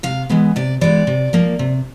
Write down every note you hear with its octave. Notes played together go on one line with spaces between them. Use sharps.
C3 F5
E3 G#3 B3
C3 D5
E3 G#3 B3 D5
C3
F3 A#3
C3